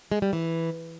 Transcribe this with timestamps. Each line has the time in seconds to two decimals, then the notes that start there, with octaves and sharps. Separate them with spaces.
0.12 G#3
0.22 G3
0.33 E3